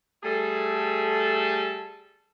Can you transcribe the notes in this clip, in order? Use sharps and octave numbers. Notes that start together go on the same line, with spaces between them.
G3 A3 G#4 A4